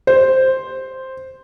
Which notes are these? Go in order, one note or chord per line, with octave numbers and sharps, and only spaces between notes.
C5